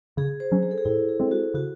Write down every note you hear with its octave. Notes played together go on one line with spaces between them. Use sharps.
C#3 G#4
C5
F#3 C#4
G#4
A4
G#4
A2 E4
G#4
G#3 C4
F#4
C#3 F#4